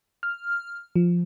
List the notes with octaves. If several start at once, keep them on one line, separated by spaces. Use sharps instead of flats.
F6
F3